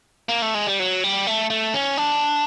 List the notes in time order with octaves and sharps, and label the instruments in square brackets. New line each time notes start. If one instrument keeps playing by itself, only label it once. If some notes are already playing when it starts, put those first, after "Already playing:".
[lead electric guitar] A#3
A3
G#3
G3
F#3
G3
A3
A3
C#4
D4